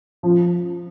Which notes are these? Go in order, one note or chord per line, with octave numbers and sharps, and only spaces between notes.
F3